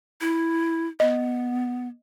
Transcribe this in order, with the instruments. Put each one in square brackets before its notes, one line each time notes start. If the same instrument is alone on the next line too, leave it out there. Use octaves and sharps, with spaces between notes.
[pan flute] E4
[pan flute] B3 [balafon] D#5